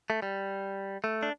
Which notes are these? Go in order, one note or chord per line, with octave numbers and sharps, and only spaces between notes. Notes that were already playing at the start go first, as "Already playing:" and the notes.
A3
G3
A3
D4